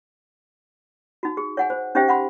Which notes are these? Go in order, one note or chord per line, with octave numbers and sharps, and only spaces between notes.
D#4 F#4
G#4
C#5 F#5 G#5
C5
C#4 D#4 G4 C5 E5 G5
F#5 B5 C6